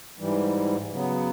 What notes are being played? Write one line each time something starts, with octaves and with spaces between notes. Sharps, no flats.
G#2 E3 G3
C#3 F#3 B3